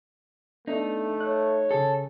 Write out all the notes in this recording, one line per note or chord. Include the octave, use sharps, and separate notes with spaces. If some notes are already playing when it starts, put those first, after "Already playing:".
A3 B3 D4 D#4
C#5 F#6
C#3 G#4 A4